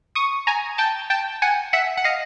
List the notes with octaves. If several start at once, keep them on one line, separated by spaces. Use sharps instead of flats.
C#6 D#6
G#5 A#5
G5 A5
G5 A5
F#5 G#5
E5 F#5
F#5
D#5 F5